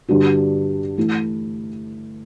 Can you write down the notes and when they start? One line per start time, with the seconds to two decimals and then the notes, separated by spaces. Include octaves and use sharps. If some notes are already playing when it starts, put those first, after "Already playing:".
0.08 G2 D3 G3 D4 F#4
0.97 E3 A3 E4